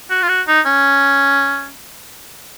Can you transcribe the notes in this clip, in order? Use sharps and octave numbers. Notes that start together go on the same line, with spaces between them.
F#4
F4
F#4
D#4
C#4